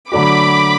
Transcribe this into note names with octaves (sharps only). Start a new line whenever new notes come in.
D3 F#3 A3 D4 F#4 B5 D6